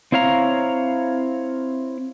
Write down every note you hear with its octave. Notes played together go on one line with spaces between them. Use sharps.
C4 E4 C#5 F5 A#5